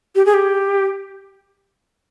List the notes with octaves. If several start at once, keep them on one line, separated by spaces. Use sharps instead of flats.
G4
G#4
G4